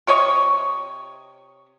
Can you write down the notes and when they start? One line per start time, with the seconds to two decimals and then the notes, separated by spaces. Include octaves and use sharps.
0.07 C3 C#5 D#5 C#6